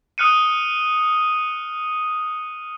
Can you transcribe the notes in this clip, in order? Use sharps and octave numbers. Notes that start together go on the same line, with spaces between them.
D#6 F6 F#6 C#7 D#7